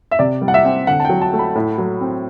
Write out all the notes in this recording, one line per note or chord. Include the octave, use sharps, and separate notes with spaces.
E5
C3 D5
G3
F#5
E5
C4
D3 F#5
A5
F#3 G5
A5
A3
B5
A2
F#3
C4